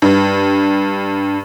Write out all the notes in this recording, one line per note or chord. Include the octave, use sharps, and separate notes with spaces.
G2